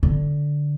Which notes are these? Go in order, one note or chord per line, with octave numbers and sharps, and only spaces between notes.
D3